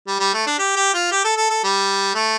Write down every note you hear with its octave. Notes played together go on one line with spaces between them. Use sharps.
G3
G3
A3
D4
G4
G4
F4
G4
A4
A4
A4
G3
A3